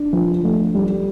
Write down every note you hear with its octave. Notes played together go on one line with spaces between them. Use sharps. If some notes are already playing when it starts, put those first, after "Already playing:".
Already playing: D4
F3
A3
G3